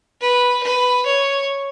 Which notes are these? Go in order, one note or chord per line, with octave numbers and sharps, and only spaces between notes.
B4
B4
C#5